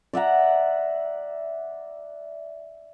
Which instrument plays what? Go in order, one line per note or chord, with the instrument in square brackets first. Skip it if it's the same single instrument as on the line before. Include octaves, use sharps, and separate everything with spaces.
[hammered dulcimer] D5 E5 F#5 A#5